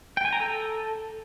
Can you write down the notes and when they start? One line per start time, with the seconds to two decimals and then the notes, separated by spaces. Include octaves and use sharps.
0.17 G5
0.25 G#5
0.33 A#5
0.40 A4